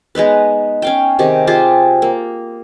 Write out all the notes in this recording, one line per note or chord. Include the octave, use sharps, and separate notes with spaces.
G#3 B3 D#4 B4
C#4 F5 G5
C3 D#3 G4 G#4
F4 G4 G#4 C5
A#3